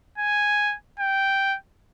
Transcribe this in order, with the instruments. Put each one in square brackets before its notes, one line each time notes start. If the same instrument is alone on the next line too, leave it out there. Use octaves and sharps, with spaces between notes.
[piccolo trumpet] G#5
G5